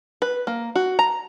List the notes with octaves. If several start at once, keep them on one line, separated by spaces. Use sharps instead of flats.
B4
A#3
F#4
A#5